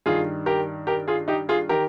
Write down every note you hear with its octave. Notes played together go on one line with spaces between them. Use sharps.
G2 D#3 F4 G#4
G4 A#4
G4 A#4
F4 G#4
D#4 G4
F4 G#4
D#3 G4 A#4